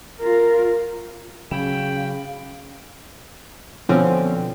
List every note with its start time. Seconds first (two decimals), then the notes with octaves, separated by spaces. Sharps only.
0.20 F4 A#4
1.51 C#3 F#3 C#4 G#4 F5 G5 B5
3.89 B2 D3 F3 C4 C#4